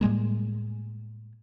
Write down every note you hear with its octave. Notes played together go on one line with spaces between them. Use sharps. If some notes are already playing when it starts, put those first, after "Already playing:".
A2 G3 G#3 A#3